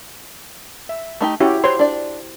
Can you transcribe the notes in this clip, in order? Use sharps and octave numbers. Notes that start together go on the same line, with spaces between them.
E5
A3 D#4 G4
C#4 E4 F#4 G4
E4 C5 C#5 C6
D4 D5